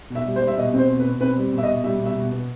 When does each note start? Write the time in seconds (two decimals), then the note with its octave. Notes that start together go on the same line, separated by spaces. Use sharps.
0.10 B2
0.15 E5
0.26 G3
0.36 C5
0.41 G3
0.47 E5
0.58 B2 D#5
0.73 C4 C5
0.89 B2
0.99 B4
1.05 B2
1.21 C4 B4
1.37 G3
1.53 B2 E5
1.63 D#5
1.68 B2
1.84 G3 E5
2.00 B2
2.06 E5
2.16 B2
2.32 B3